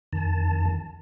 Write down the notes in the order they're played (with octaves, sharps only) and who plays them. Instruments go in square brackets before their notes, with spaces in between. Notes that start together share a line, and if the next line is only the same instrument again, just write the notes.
[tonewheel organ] F2 D#3 A5